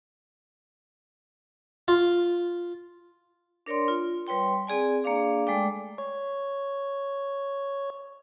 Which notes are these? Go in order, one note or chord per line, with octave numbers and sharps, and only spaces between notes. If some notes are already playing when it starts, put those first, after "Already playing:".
F4
D4 A#4 C#5 D5 C6
F4
G3 B4 C#5 G5 C6
C4 G#4 D5 G#5
A#3 D4 G#4 D5 F5 D6
G#3 A3 A4 D5 G5 D6
C#5 C#6